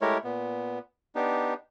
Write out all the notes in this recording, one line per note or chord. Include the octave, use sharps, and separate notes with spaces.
G#3 A3 E4 G4 A#4 C#5
A#2 B3
B3 D4 D#4 G4